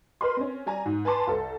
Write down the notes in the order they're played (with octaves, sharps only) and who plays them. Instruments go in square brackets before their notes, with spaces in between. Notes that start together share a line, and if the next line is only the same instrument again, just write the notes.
[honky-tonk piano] A#4 B4 D#5 C6
C4 C#4
G3 G#5 A#5
G#2
B4 G#5 A5 C6 D6
C2 A4